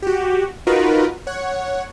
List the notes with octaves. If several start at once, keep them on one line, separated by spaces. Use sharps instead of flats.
F#4 G4
D#4 F4 F#4 A#4 B4
C#5 F#5